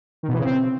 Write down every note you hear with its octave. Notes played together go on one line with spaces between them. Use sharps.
D#3
B2
E3
C#3
C4